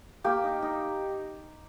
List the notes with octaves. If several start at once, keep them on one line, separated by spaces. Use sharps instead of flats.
A#3 G4
D#4
D#4